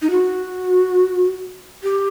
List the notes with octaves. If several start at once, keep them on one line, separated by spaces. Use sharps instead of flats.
D#4
F#4
G4